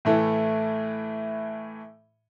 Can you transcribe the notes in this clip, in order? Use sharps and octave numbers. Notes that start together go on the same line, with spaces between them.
A2 E3 A3